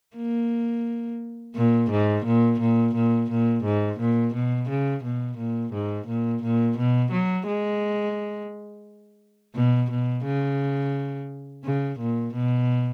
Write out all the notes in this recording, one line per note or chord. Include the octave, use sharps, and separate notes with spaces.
A#3
A#2
G#2
A#2
A#2
A#2
A#2
G#2
A#2
B2
C#3
B2
A#2
G#2
A#2
A#2
B2
F#3
G#3
B2
B2
C#3
C#3
A#2
B2